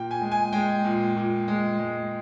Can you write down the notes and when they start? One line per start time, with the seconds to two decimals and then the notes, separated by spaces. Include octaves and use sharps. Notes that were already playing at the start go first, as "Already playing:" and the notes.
Already playing: A#2 G5
0.11 G#5
0.21 G#3
0.31 G#5
0.52 G#3 G5
0.84 A#2
1.16 A#2
1.48 G#3
1.79 G#3